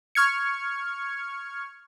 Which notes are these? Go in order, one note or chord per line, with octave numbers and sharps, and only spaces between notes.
C#6 F6 G#6 C#7